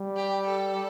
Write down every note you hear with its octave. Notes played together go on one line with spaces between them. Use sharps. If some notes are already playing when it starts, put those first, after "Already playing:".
Already playing: G3
G4
A4